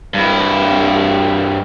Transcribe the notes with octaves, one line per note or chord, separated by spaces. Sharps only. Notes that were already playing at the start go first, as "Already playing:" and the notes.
G2 E4